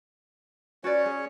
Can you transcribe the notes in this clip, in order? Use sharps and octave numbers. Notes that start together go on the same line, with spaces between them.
C#4 F#4 B4 C#5 D5
G#4